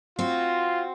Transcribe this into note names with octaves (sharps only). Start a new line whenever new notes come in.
C4 F4 F#4